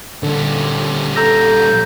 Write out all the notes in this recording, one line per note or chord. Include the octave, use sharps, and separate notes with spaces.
A#2 D3 G3
A4 A#5 E6 G6 A#6